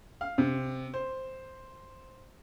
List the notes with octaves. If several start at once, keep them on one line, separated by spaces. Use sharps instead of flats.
F5
C3
C5